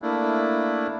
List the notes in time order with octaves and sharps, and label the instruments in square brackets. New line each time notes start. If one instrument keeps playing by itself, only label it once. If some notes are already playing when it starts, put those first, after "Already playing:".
[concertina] A3 A#3 D4 E4